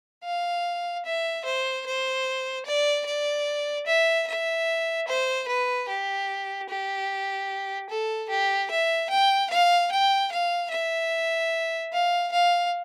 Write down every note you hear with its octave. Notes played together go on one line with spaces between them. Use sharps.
F5
E5
C5
C5
D5
D5
E5
E5
C5
B4
G4
G4
A4
G4
E5
G5
F5
G5
F5
E5
F5
F5